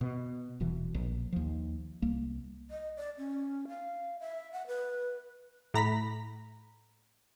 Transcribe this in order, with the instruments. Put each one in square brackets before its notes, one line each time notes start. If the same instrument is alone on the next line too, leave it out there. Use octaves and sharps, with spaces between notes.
[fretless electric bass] B2
D#1 B2 E3
A#1
D#2 F3
C2 A#3
[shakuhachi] D#5
D5
C#4
F5
E5
F#5
B4
[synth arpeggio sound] A2 A#5 B5 B6